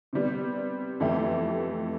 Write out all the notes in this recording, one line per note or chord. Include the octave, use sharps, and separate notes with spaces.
C3 G3 B3
F2 E3 A3 E4 G4